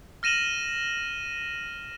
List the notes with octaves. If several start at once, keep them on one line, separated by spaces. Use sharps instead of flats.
F6 A#6 D#7 E7 F#7 G7